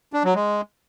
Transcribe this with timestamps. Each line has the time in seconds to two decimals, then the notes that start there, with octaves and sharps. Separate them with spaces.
0.13 D4
0.24 F#3
0.35 G#3